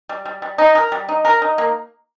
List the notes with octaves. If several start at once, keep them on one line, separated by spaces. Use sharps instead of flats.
G3
G3
G3
D#4
A#4
G3
D#4
A#4
D#4
A#3